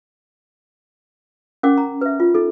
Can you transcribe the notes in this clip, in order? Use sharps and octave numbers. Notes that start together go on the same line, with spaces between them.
C#4 A#4 F#5 D6
A#5
B4 E5
F4
D#4 A4